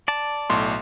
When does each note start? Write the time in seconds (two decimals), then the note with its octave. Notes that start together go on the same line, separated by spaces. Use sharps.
0.08 D5 A5
0.50 B1 A2 C6